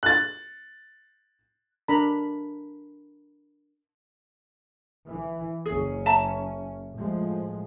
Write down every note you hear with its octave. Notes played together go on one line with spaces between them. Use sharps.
F#6 A6
D4 A#4 A#5 B5
E3
F#1 C#4 G#4
E5 A5 A#5
A2 F3 G#3